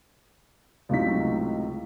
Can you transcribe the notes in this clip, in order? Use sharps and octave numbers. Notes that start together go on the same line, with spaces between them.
C#2 A2 C3 F#3 D#4 B6